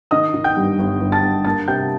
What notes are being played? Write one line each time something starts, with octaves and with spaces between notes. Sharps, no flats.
D#3 D#5 D#6
D#3
G5 G6
G2
G1
G1
A5 A6
G1
A#3 A5 A6
C3 G5 G6